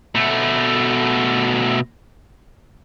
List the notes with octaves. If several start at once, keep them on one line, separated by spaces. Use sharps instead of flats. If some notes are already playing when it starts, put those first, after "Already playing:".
B2 A3